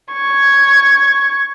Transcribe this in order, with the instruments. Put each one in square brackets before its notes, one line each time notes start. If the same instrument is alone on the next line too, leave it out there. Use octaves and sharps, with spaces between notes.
[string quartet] C#6 G#6